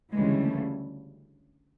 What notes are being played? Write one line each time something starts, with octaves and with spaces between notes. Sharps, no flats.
D2 C#3 E3 G3 G#3
A3